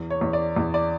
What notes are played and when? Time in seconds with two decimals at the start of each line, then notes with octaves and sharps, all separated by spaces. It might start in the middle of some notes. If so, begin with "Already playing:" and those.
Already playing: E2
0.10 C#5
0.21 E2
0.33 D5
0.56 E2
0.74 D5